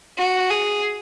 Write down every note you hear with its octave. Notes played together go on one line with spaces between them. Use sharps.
F#4
G#4